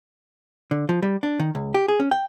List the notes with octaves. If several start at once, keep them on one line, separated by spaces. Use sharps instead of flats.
D3
F3
G3
D4
D#3
C#2
G4
G#4
C#4
G5